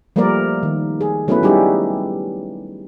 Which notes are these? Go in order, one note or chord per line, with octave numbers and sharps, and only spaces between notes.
F3 G3 A3 A#3 A#4 D5
D#3
G#4
F#3 A3 B3 C#4 E4 B4
G3 C#4 D#4 E4 G4 G#4